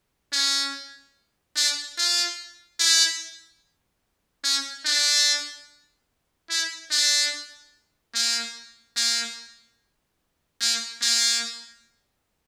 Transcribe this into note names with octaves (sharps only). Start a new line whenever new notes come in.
C#4
D4
F4
E4
C#4
D4
E4
D4
A#3
A#3
A#3
A#3